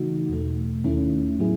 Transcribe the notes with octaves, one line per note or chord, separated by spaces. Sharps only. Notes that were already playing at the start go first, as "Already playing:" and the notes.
Already playing: C#3 E3 A3 D#4 F#4
E2 B2 A3
D#2 D#3 A3 C#4 E4
A2 F#3 B3 E4 G#4